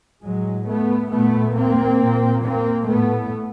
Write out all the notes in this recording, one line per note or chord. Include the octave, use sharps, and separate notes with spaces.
A2 F#3 G#3
A3 B3
A#2 A3 B3
A#3 C4
A#2
A#3 C4
A2 A3 B3